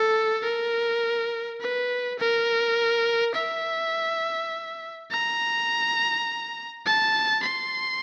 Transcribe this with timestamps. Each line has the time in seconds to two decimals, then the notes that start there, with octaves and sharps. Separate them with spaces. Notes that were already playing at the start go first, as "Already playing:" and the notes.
Already playing: A4
0.44 A#4
1.61 B4
2.19 A#4
3.35 E5
5.11 A#5
6.85 A5
7.43 C6